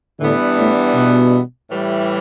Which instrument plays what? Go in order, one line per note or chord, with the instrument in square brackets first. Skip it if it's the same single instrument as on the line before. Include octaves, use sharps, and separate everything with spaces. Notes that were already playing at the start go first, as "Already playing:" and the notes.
[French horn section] A2 D3 [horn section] E3 G3 B3 D4
[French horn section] A2
B2
[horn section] A2 E3 G3